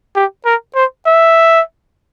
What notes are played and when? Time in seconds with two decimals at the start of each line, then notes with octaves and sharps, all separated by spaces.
0.16 G4
0.45 A#4
0.75 C5
1.06 E5